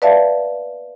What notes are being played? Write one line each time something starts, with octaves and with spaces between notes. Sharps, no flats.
B4 D5 E5 F5 A5